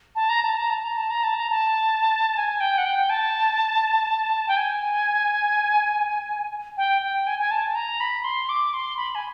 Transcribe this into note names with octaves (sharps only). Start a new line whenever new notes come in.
A5
A#5
A5
A#5
A5
A#5
A5
A#5
A5
A#5
A5
G#5
G5
F#5
G5
A5
G5
G#5
G5
G5
G#5
G#5
A5
A#5
B5
C6
D6
C6
B5
G#5